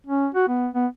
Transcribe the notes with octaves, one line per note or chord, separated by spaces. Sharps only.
C#4
F#4
B3
B3